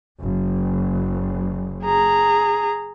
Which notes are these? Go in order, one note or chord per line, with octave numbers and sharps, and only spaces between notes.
F#1
G#4 A#5